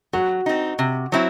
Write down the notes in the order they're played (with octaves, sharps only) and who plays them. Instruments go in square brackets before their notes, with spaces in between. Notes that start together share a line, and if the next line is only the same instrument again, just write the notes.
[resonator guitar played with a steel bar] F#3 [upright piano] F#4
[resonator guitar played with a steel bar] C4 D#4
C3
F#3 C4 E4